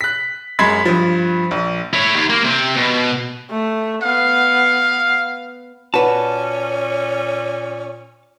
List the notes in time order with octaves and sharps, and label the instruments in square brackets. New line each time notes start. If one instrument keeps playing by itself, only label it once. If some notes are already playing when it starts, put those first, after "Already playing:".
[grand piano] F#6 B6
F#2 G#3 B5 C6 G#6 B6
G2 F3
A#1
[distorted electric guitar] E4 C#5
D#2
A#3
C3 C4
B2
[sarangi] A3
[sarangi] B3 [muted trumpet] F5
[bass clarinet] A#2 [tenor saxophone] C#4 [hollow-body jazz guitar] F#4 B4 [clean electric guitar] A5